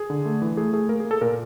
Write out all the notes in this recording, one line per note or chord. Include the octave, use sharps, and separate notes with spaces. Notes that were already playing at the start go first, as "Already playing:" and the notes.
Already playing: G#4
D3
A3
E3
A3 G#4
A3 G#4
A#3 A#4
G#4
A#3
A4
A#2 A#4